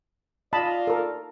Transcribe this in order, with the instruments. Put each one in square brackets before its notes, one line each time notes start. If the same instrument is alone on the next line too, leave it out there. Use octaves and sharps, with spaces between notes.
[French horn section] F4 D5 [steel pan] D#5 A5 B5
[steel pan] A4 A#4